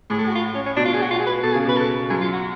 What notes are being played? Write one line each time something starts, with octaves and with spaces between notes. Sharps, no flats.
A2 G#4
A4
F#4
F4
C#4
C#4
B2 D4
F4
G#4
F#4
F4
G#4
B4
B2 A4
G#4
C#3
B2 B4
A4
F#2 G#4
F4
F#4